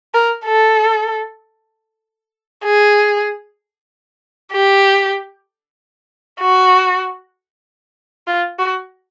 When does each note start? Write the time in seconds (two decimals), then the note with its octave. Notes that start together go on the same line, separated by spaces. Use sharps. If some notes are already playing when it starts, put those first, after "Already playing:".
0.14 A#4
0.46 A4
2.64 G#4
4.53 G4
6.40 F#4
8.27 F4
8.59 F#4